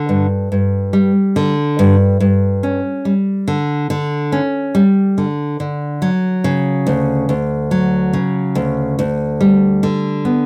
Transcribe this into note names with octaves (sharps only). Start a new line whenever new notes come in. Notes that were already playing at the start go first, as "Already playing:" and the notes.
Already playing: D3
G2
G2
G3
D3
G2
G2
C#4
G3
D3
D3
C#4
G3
D3
D3
F#3
C#3
D2
D2
F#3
C#3
D2
D2
G3
D3
B3